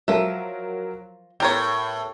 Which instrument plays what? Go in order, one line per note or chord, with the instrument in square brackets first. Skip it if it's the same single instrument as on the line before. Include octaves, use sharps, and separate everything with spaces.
[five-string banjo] F3 E5 [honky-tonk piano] F#3 A#4
[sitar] A2 [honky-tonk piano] B3 [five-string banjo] G4 A#4 C#5